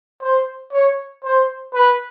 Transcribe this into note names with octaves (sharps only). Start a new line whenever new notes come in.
C5
C#5
C5
B4